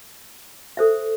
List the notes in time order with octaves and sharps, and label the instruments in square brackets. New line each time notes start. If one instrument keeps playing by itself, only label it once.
[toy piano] A4 C5 E5